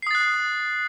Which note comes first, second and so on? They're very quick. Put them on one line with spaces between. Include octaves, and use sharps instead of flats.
C7 D#6 A6 F#6